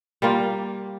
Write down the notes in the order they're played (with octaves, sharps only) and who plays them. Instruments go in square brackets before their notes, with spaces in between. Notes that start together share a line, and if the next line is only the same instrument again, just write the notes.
[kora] G3 A#3 F4